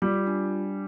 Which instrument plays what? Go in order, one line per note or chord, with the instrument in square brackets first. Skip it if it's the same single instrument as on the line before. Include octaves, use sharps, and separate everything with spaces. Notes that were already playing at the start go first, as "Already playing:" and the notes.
[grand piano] G3 [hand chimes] F4
[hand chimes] D4